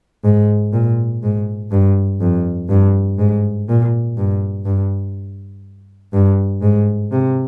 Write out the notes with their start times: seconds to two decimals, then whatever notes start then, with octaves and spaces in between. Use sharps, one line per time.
0.24 G#2
0.73 A#2
1.23 G#2
1.71 G2
2.21 F2
2.69 G2
3.19 G#2
3.68 A#2
4.17 G2
4.65 G2
6.13 G2
6.62 G#2
7.11 C3